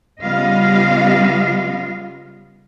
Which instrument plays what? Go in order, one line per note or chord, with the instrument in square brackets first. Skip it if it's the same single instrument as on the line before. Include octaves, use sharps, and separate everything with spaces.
[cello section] C#3 G3 B3 F4 D#5 F5